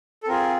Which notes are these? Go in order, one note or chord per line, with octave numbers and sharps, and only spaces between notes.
A4
C4 F4 G#4 A#4